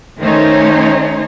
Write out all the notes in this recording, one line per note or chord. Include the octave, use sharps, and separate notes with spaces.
D#3 A3 C#4 D#4 C5 C#5